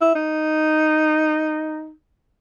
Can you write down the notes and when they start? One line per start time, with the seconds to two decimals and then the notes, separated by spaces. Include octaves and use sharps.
0.01 E4
0.15 D#4